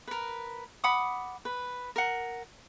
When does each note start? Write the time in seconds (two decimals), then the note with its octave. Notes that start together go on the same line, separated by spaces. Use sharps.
0.08 A#4 B4
0.84 F#5 B5 D6 D#6
1.45 B4
1.96 A#4 F#5